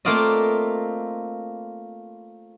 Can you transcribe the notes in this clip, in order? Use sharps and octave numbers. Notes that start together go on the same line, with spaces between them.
A3 A#3 C4 F4 D5 D#5